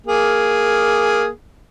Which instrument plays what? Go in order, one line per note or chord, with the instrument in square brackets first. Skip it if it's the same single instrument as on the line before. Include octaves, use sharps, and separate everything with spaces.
[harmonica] A#3 G#4